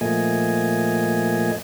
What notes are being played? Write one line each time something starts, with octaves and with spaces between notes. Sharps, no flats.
A#2 F3 A3 A#3 D#5 G#5